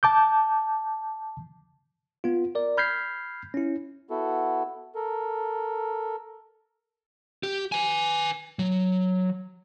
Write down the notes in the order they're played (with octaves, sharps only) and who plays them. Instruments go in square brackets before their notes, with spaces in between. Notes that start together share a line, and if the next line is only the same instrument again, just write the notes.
[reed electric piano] A5 D6 G6
[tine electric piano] B3 F4
A#4 D5
B5 F6 G6 G#6 B6 C7
C#4 E4
[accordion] B3 E4 F#4 A4
A4 A#4
[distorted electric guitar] G4
B4 G#5
F#3